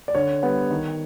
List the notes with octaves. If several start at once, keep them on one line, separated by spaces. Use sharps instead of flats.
D5
D3 C#5
G3 B3
D#3